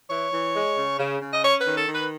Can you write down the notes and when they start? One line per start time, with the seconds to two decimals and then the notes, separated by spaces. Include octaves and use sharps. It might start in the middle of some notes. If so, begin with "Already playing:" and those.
0.10 E3 C#5
0.32 E3
0.54 G#3
0.77 C#3
0.99 C#3
1.21 C#3
1.32 D#5
1.43 C#4 C#5
1.60 B4
1.65 D#3
1.76 A4
1.88 D#3
1.93 B4